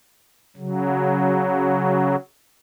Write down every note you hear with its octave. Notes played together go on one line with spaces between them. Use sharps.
C#3 F#3